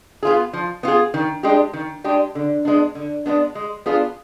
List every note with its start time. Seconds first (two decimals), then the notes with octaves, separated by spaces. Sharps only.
0.23 B3 F4 G#4
0.53 F3
0.83 B3 F4 G#4
1.14 D#3
1.43 G#3 D4 G4
1.74 D#3
2.04 G#3 D4 G4
2.35 D3
2.65 G#3 B3 D4
2.95 D3
3.26 G#3 B3 D4
3.55 G#3
3.86 B3 D4 F4 G#4